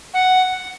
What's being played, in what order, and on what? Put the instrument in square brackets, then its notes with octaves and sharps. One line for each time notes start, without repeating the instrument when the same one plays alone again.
[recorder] F#5